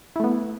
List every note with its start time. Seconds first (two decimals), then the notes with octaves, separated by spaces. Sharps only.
0.16 E4
0.20 A3
0.24 B3